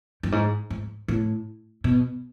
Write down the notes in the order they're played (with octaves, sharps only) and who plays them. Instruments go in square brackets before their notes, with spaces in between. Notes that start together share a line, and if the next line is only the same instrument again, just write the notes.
[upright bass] G2
G#2
G#2
A2
B2